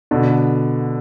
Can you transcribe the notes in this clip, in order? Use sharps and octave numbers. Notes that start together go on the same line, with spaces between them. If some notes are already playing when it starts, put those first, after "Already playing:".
B2 D3